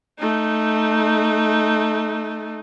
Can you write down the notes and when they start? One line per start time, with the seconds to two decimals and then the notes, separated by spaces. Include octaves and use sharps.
0.19 A3 D#4